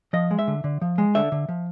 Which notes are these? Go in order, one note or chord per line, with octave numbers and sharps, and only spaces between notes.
F3 D#5
G#3
E5
D3
D3
F3
G#3
D3 E5
D3
F3